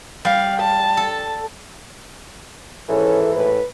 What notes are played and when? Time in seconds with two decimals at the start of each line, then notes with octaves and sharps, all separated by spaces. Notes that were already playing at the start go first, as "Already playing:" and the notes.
0.25 G3 F5
0.61 A5
0.97 A4
2.89 D#2 G#2 E3 C#4 A4
3.36 A2 B4